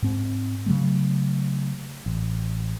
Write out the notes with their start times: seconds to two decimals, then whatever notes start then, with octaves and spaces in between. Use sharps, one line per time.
0.02 G#2 C4
0.66 C#3 F#3 A3
2.06 A1